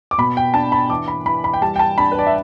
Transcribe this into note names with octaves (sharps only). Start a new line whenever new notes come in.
D6
B2 B5
G5
D4 A5
B5
E3 D6
B5
E3 B5
B5
G5
G3 A5
G5
A5
D4 B5
B4
D5
E5